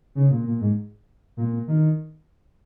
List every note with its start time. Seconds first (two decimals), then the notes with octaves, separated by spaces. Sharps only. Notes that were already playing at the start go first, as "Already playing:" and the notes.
0.15 C#3
0.31 A#2
0.46 A#2
0.61 G#2
1.37 A#2
1.68 D#3